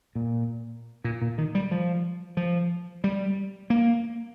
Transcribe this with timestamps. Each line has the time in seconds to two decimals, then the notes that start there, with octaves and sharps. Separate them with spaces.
0.15 A#2
1.04 A#2
1.22 A#2
1.38 D#3
1.55 G3
1.71 F3
2.37 F3
3.04 G3
3.70 A#3